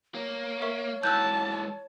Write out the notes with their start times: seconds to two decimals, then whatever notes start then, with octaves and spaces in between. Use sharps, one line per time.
0.15 A#3 C#5
0.62 A#4 E5 C#6
1.03 G#2 E3 A5 E6 F#6 G6